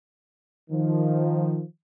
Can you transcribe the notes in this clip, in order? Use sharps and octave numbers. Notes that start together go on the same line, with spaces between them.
D#3 F3